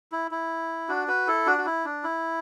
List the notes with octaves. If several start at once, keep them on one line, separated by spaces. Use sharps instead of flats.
E4
E4
D4 F#4
F#4 B4
E4 A4
D4 F#4
F#4
E4
D4
E4